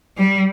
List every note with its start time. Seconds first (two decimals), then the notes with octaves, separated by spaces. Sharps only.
0.17 G3